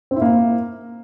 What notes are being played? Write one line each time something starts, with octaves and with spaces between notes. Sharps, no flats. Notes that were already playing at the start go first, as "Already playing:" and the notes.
C4
E4
A#3